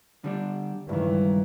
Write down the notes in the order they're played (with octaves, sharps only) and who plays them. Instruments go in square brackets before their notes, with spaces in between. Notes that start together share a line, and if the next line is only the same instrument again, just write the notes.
[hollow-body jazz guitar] D3 G3 D4
[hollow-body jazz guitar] C#2 D#3 [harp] G2 [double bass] E3